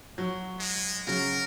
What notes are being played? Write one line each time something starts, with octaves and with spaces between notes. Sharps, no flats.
F#3
G#3
C#3 F#3 A#4